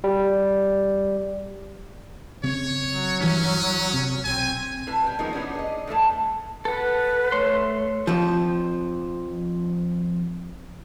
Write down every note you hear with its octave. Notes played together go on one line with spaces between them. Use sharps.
G3
C#3 C4 C#5
F#3
G2 E3 C#4
C3
B1 C4 G#5
A2 B4 A5
G3 G5
D#3 F3 G#3 A#3 B3 C#4
E3 B3 C#4 D4
G#4 D#5
A2 E3 A3 A5
A4 B4 F#5
A3 C#5 C6
F2 F3